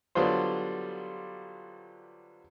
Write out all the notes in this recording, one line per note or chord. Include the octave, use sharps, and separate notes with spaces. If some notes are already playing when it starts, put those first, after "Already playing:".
D3 F#3 G3 B3 F4 C5